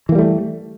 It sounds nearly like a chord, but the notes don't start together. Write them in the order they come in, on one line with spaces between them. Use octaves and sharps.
E3 A#3 G3 A3